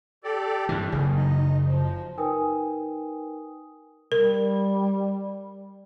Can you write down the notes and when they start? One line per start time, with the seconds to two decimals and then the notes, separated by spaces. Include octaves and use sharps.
0.24 G4 A4 D5
0.69 G2 E3
0.92 F#1 G3 G#4
1.16 D#4 D#5
1.65 F3
2.17 D#4 A#4 B4 G5 G#5 D#6
4.12 G3 A#4